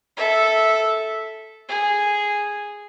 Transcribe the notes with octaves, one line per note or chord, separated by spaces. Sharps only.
A4 E5
G#4